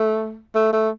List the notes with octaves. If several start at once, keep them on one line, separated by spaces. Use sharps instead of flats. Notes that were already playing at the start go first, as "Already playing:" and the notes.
Already playing: A3
A3
A3